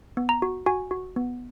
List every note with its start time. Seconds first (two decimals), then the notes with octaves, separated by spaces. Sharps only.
0.17 B3
0.29 A#5
0.42 F#4
0.66 F#4 G#5
0.91 F#4
1.16 B3